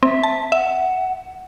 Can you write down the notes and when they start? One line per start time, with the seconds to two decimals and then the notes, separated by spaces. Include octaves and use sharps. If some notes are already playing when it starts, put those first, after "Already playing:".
0.03 C4 E5
0.23 A5
0.52 E5 F#5